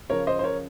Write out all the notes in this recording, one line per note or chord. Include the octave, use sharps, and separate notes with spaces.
C#3 F3 A#4 C#5
C5 D#5
C5
A#4 C#5